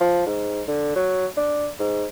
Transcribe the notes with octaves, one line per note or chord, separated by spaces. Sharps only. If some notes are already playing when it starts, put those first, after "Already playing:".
F3
G#2
D3
F#3
D4
G#2